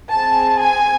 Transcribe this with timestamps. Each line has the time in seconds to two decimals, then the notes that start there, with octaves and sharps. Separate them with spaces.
0.12 C4 G#4 A5
0.60 G#5